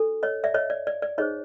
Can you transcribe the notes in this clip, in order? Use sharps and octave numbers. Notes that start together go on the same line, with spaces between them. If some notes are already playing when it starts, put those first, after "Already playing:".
Already playing: D4 F#4 A4
C#5 D#5
D5 E5
C#5 D#5
D5
D5
D5
D#4 G#4 C5 C#5 D#5